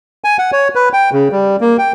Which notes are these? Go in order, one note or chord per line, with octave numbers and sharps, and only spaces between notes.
G#5
F#5
C#5
B4
G5
C#3
G3
A#3
G5